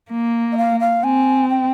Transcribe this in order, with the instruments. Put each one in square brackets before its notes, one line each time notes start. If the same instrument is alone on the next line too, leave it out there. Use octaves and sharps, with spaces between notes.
[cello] A#3
[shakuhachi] D#5
F5
F5
[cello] C4 [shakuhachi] G#5
[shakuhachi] G5